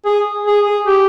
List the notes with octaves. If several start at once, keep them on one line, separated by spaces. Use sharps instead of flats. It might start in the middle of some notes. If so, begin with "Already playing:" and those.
G#4
G#4
G#4
G4